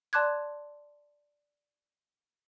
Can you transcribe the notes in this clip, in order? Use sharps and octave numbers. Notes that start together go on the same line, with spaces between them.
D5 A5 C6 D6 F#6 G#6